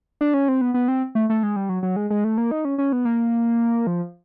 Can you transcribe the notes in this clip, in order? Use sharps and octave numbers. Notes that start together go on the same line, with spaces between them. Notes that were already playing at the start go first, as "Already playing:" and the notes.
D4
C#4
C4
B3
B3
C4
A3
A3
G#3
G3
F#3
F#3
G#3
G#3
A3
A#3
D#4
C#4
C#4
B3
A#3
F3